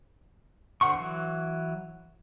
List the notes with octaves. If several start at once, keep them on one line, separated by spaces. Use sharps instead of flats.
D3 C5 F#5 C6 C#6
E3 F#3